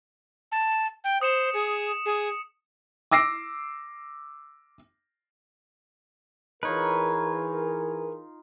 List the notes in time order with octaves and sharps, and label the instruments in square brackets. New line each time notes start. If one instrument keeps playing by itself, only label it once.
[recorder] A5
G5
[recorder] C5 [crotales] D#6 C#7 E7
[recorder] G#4 [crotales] C#7
[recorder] G#4
[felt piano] D6 E6 A#6 C7 D7
[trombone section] E3 G#4 A#4 [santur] D#4 F4 [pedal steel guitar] B4 C#5